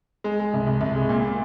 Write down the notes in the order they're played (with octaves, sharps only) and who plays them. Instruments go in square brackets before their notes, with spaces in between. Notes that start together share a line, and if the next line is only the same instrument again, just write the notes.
[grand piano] G#3
G#3
C2
C2
C2
G#3
A#2
A#2